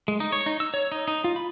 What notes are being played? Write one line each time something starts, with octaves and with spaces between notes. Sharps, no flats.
G#3
D#4
C#5
D#4
E6
C#5
D#4
D#4
F4
B5